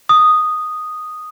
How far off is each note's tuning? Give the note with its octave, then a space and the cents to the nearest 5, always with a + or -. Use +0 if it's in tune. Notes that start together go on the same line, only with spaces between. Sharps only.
D#6 -5